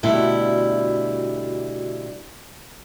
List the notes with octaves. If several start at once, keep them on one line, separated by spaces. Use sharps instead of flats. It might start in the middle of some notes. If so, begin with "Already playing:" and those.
D2 B2 G3 E4